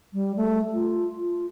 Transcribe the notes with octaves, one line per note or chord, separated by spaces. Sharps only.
G3
A3
F4
F4